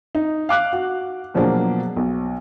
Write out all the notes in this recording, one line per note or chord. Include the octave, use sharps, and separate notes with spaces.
D#4
F5 D6 F#6
F#4
B2 F3 F#3 A#3 D4 G#4
B1